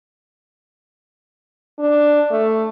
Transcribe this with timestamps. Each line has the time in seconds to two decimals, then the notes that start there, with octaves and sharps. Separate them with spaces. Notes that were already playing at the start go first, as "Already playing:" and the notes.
1.79 D4
2.31 A3